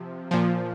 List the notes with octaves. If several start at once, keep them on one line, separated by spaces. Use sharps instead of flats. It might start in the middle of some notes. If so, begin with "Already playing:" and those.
Already playing: C3 F3
A#2 F3